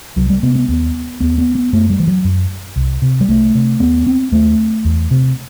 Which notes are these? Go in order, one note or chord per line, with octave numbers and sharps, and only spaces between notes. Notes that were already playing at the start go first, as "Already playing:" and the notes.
C2 F#3
G3
C3 B3
B3
D#2 B3
D#2 B3
B3
B3
F#2 A3
G3
E3
F#3
F#2
C2
C3
G3
C2 A3
C3
D#2 B3
C4
D#2 A3
E2
C3